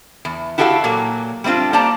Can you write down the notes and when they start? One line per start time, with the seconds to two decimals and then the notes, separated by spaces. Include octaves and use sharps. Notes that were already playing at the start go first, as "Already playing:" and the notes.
0.25 E2
0.58 E4 F#4 G4 A4 D#5 F5
0.84 A#2 F#3 A#3
1.44 G3 A3 C4 D4 F4
1.73 A#3 G4 C5 D5 A5 A#5